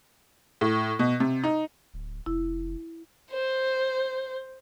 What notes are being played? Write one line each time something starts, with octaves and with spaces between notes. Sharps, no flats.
A2
B2
C3
D#4
D1
F1 E4
C5